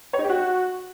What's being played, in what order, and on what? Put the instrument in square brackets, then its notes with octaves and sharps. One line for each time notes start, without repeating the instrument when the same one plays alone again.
[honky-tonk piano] C#5
D#4
G4
F#4